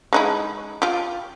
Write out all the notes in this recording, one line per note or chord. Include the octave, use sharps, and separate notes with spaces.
G#3 D#4 E4
F4 G4